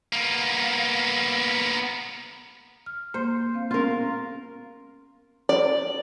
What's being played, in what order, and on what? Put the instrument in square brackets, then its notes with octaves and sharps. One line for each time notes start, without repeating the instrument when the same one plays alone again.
[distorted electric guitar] A#3 B3
[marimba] F6
[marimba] A#3 [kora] C5
[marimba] C4 F5
[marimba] B3 C#4 F5 [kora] F4 A#4
[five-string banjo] D5